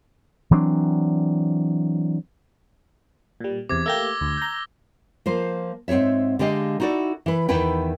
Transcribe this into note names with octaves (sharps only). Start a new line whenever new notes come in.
E3 F#3 C4 D4
A#2 G3
E2 C3 D6 G#6
A3 A#3 G4 E6 A#6 G7
D2
A#5 G6
F3 A#3 C5
G#2 C4 G#4 C#5 E5
D3 G#3 G4 D#5 F5
D#4 E4 F#4 A4 D5
E3 B4
E2 D#3 E4 B4 G5